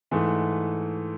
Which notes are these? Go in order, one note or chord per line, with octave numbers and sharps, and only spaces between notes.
G#2 E3 A3